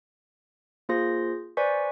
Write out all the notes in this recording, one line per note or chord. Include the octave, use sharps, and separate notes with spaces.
A#3 F4 G#4 C5 C6 A#6
B4 C5 D5 G#5 C#6 B6